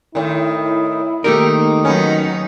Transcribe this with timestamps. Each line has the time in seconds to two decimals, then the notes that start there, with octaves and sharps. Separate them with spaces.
0.15 A2 D#3 E4
1.24 D#3 A3 A#3 D#4 G4 A#4
1.85 F#3 B3 C#4 D#4